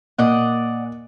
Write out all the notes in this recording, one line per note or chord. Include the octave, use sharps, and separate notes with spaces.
A#2 D5 D#5 F#5